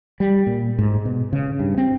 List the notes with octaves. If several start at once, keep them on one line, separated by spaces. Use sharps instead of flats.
G3
A#2
G#2
B2
C#3
G2
C4